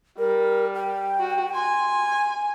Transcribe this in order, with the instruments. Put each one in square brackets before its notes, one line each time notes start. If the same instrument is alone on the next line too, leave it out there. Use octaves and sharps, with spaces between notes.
[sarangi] G3 [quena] A#4
[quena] G5
[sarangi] F#4
[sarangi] G#5 [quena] C6